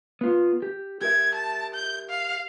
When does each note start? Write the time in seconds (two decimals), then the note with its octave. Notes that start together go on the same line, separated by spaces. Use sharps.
0.21 B3 F4
0.62 G4
1.01 G4 A#4 E5 G#6
1.35 A5
1.74 G6
2.10 F5